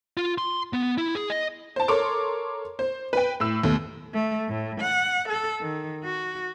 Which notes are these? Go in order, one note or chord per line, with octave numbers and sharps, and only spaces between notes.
F4
C6
B3
E4
G#4
D#5
C5 A5
A4 A#4 C#5 C6 D6
C5
B4 G5
A2 E6
D#2 B2 A3
A3
A2
F#5
A4
D#3
F#4